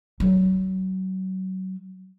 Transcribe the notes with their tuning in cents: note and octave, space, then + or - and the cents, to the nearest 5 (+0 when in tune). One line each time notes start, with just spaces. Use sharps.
F#3 +25